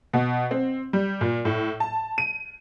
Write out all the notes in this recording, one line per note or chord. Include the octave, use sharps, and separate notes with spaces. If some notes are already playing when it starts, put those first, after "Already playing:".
B2
C4
G3
A#2
A2
A5
D#7